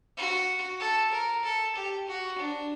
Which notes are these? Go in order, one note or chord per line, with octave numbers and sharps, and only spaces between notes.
F#4
A4
A#4
A4
G4
F#4
D4